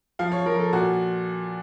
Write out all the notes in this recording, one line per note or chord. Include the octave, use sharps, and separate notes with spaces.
F3 F5
C#5
F3 A#4
A4
A#2 F#4